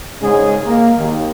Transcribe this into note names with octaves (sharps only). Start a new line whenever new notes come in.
C2 G#2 C#3 G#3 C#4 G#4
A#3
D#2 D#3